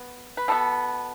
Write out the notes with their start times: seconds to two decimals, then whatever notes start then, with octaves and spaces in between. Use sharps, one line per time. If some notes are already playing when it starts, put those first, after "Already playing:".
Already playing: B3
0.37 B4
0.48 B2 B3 A4